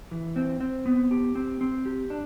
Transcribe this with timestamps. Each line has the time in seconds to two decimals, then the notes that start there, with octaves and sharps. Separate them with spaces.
0.11 E3
0.36 C4
0.61 C4
0.86 B3
1.11 G4
1.35 C4
1.61 C4
1.86 G4
2.10 D4